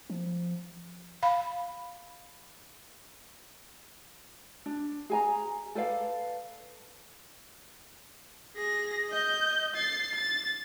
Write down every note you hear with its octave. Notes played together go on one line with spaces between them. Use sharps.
F3
F5 B5
D4
G#4 G#5 A#5
A4 B4 D5 F5
G#4 A#6
D#5 G6
A6 C7
A6